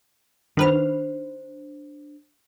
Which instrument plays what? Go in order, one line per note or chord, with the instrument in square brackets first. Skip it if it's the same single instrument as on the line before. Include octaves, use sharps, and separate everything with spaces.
[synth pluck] D#3 B4 F6 [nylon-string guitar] D4 C5